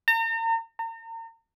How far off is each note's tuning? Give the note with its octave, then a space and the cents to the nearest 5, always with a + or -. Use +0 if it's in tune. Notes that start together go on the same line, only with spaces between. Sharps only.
A#5 -40
A#5 -40